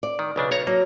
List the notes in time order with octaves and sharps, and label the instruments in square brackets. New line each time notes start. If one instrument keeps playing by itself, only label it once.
[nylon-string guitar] D5
[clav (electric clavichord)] D#3
B1 C#3 D4
B1 C#5 A#5
[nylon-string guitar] F#3 [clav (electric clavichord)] A#3